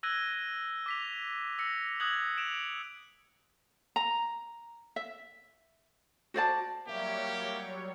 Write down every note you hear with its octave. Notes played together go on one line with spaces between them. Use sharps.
E6 F#6 G#6 A#6 D#7 G7
D6 B6 F7
E6 A#6 C#7
D#6 F#6 G#6 A#6 F#7
D7 E7 F7
A#5
E5
F#4 C5 D5 A5
F#3 G3 A#3 G4 C#5 D5 E5